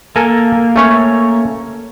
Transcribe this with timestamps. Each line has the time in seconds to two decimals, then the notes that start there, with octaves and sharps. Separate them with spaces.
0.16 A#3 A4 A#4 G#5
0.76 A3 C#4 C#5